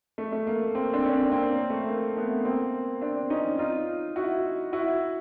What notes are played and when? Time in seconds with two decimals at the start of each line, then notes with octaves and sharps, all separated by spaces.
0.18 A3
0.32 A3
0.47 A#3
0.75 A#3 C4
0.93 C4 D4
1.06 C#4
1.12 C4 D4
1.31 A#3 C4
1.51 A#3
1.70 A3
1.88 A#3
2.16 A3 B3
2.45 A#3 C4
3.02 C4 D4
3.30 C#4 D#4
3.59 D#4 F4
4.16 E4 F#4
4.73 E4 F#4